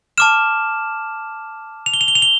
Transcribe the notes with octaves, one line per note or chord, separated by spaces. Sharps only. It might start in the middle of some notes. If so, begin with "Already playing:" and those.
A5 D6 F6 E7
F7
G7
F7
G7
F7
G7